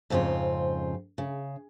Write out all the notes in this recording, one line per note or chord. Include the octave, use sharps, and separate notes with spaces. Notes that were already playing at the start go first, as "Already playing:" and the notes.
F2 G#2 C#3 C4 F4
C#3